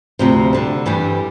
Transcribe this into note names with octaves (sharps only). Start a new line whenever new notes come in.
D2 C3 F3
D3 G3 D4
G2 E3 G3